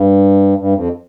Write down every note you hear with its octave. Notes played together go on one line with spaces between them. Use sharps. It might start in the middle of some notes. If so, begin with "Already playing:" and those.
Already playing: G2
G2
F2